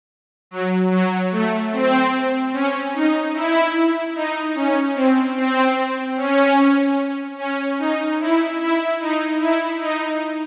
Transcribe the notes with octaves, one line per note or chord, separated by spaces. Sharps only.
F#3
F#3
A3
C4
C#4
D#4
E4
D#4
C#4
C4
C4
C#4
C#4
D#4
E4
E4
D#4
E4
D#4